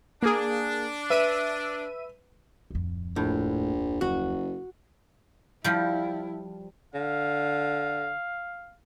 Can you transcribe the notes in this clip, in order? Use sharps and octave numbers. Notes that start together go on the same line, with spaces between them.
A#3 D4 G#4
B4 E5 D#7
D1 F2
A#1 A2
F#1 F#4
F3 G3 E4
D3 F5